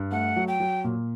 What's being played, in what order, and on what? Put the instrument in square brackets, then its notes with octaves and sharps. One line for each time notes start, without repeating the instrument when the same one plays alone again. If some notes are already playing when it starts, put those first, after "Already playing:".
Already playing: [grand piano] G2
[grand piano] A3 [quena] F#5
[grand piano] F#3
[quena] G5
[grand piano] F#3
A#2